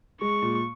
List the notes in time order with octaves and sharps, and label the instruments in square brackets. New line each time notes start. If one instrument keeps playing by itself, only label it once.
[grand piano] G#3 [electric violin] C#6
[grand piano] A#2